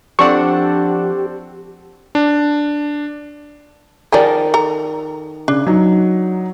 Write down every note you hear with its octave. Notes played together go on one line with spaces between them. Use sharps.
F3 C4 D4 G4 A4 D5 F#5 C#6
D4
D#3 F3 G3 G#4 A#4 D5
A4 A#5
C#3 D4
F#3 D#4